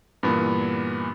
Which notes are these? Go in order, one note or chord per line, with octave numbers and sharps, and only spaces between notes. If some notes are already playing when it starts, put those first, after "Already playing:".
G2 A#2 E3 B3